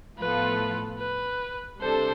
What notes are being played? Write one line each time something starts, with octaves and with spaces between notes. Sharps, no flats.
A2 F3 B3 F4 A4 B4
B4
C3 G3 D4 A4 C5